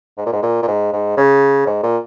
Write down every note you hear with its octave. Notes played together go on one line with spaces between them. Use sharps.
G#2
A#2
G#2
A#2
A#2
G#2
G#2
C#3
G#2
A#2